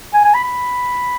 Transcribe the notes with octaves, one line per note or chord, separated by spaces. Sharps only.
G#5
G#5
B5
B5